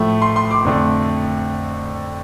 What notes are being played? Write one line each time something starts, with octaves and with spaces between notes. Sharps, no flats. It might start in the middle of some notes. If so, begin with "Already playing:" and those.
Already playing: A2 F3 A3
C6
C6
D6
F2 D3 A3